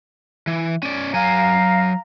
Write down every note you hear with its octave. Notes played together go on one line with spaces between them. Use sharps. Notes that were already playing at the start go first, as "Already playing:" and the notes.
E3
C#4 D5
F#3 F5 G#5 A#5